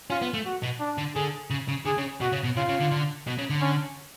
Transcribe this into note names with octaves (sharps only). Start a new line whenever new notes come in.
C#4 F4
B3
A3
F#4
B2
D4
D3
D3 G#4
C#3
C#3
D3 G#4
C#3
B2 F#4
C#3
B2
C#3 F4
C#3
D3
D3
B2
C#3
D3
C#4